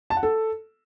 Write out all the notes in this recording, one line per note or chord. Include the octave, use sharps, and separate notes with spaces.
A5
F#5
A4